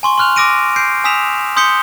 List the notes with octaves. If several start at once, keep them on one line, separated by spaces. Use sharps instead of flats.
G#5 C6 C#6
C6 C#6 F6 F#6 F7
D6 E6 A#6 D7 D#7
G6 C7 D7
G#5 D#6 E6 B6 E7 F7
C6 D#6 G6 B6 C#7 G7